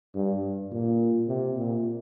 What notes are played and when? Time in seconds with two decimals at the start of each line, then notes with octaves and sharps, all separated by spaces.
0.15 G2
0.71 A#2
1.28 C3
1.56 A#2